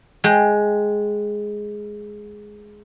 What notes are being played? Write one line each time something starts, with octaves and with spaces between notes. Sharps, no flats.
G#3 G5